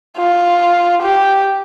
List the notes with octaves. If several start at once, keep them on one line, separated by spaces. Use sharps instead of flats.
F4
G4